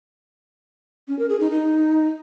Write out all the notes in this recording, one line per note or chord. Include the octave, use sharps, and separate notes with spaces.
C#4
A#4
G#4
D#4
D#4